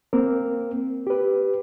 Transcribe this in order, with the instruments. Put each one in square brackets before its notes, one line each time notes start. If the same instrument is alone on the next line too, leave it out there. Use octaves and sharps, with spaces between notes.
[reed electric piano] A#3 C4 A#4
G4 B4